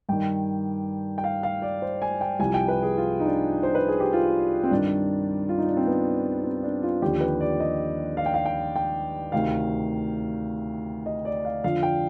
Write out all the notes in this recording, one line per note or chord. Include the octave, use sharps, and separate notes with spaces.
G2 D#3 G5
G5
F5
F5
D5
C5
G#5
G5
C2 C3 F3 G#5
G5
B4
G#4
F4
D#4
D4
C5
B4
G#4
G4
F4
C4
G2 D#3 D4
F4
D#4
D4
C4
B3
C4
D4
F4
D#2 D3 F3 G4
B4
D5
D#5
F5
G5
F5
G5
G5
D2 C3 D#3 F5
D#5
D5
F5
F2 D3 F3 F5
G5